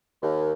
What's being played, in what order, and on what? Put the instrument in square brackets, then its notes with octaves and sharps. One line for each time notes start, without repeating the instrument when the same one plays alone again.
[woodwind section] D#2